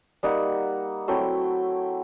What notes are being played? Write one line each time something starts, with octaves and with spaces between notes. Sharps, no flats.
G3 A#3 D#4 F#5
F#3 A3 C4 E4 G5